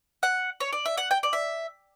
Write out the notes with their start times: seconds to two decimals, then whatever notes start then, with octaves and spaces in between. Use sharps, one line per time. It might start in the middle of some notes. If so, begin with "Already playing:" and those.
0.23 F#5
0.60 C#5
0.73 D5
0.86 E5
0.97 F#5
1.11 G5
1.23 D5
1.33 E5